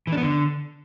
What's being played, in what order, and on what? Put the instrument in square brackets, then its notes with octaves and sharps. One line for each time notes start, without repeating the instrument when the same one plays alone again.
[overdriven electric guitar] E3
D4
B3
D3